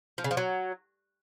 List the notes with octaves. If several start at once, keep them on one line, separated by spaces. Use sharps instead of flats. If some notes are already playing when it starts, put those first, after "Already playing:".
F3
C#3
F3
F#3